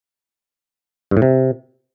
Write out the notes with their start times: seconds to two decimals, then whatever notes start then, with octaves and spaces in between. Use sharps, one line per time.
1.11 G2
1.17 A2
1.22 C3